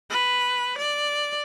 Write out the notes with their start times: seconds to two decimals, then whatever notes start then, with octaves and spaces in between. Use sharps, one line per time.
0.10 B4
0.78 D5